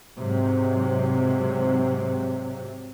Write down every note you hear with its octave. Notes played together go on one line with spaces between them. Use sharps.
G#2 C3 F#3